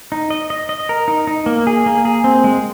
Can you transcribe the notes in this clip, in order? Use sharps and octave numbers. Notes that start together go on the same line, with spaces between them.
D#4
D#5
D#5
D#5
A#4
D#4
D#4
A#3
G#4
A#3
G#4
C4
G#3